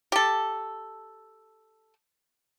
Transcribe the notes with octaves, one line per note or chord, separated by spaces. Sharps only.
G4 A4